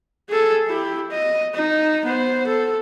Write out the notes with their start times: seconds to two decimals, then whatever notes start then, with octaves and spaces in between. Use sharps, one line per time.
0.29 G#4 A4
0.68 E4 G4
1.10 D#5
1.55 D#4
2.05 B3 C5
2.47 A4